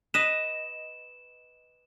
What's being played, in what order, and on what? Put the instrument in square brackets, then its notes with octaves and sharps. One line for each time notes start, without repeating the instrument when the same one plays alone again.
[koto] B4 D#5 [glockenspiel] E7